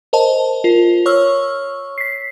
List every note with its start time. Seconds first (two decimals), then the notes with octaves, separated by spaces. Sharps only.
0.13 A#4 C5 D#5 A5
0.64 F4 A#4
1.06 C#5 C#6 E6 F6
1.98 B6 C7